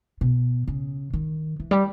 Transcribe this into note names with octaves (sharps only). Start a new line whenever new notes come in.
B2
C#3
D#3
E3
G3